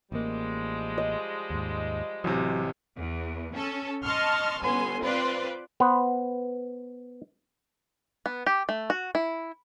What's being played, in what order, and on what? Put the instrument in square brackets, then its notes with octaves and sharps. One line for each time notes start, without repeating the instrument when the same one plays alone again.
[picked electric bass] A1 A#3 [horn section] F3 G3 G#3
[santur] D#5
[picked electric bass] D#2 G#2
[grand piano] A1 C3 [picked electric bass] F#3
[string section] E2
C#4 A4
D#5 A5 C6 C#6 F6
G1 B3 C#4 G#5 C6
C4 F4 B4 C5 D5 C6
[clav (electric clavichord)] B3 B4 C5
[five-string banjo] B3
G4
A3
F#4
E4